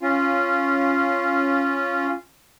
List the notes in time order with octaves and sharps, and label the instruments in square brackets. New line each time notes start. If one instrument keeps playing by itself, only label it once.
[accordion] C#4 F4